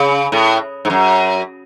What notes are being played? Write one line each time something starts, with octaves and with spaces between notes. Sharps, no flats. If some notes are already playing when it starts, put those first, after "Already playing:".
Already playing: C#3
A2
G#2
F#2